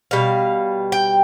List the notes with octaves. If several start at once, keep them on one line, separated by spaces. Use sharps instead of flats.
B2 G3 F5
G5